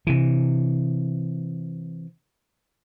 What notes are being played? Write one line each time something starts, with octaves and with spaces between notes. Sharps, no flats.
C3 E3